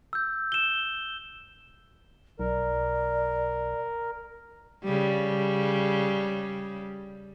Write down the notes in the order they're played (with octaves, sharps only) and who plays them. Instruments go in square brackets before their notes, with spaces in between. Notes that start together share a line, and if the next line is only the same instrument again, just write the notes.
[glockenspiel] E6 G6
E7 G7
[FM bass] B1 [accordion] A#4 [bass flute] D5
[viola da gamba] C#3 G3